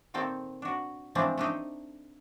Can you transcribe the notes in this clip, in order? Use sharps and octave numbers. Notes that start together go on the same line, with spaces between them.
A#2 D#3 C4 A4
D4 F#4
E3 F3 G#3 A3 C4 D4
A3 D4 D#4